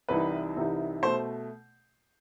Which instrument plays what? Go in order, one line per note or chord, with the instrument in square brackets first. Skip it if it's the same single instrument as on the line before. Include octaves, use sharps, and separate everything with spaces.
[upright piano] C2 C3 E3 G3 D#4 B4
C2 C3 E3 G3 D#4
B2 A3 C5